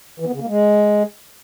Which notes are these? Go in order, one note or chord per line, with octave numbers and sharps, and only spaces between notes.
E3
B3
C#3
A#3
G#3